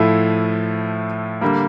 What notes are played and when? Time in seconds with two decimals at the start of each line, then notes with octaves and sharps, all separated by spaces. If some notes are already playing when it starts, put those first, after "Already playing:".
Already playing: A2 F3 A3 E4
1.41 D3 G3 A#3